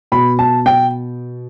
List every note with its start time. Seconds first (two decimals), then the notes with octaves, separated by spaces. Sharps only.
0.12 B2 B5
0.39 A5
0.66 G5